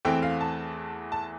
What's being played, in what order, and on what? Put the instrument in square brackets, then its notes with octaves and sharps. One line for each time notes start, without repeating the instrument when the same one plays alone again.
[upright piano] E2 E3 A3 C4 G5
F5
A5
A5